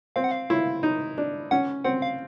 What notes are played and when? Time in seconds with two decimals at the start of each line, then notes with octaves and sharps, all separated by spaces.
0.16 C4 F5
0.24 F#5
0.31 F5
0.50 E4
0.83 D#4
1.18 D4
1.51 C#4 F#5
1.84 C4 F#5
2.02 F5